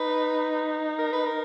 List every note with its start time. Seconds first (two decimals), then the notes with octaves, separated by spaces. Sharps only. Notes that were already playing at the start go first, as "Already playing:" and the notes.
Already playing: D#4 B4
0.99 A#4
1.13 B4
1.25 A#4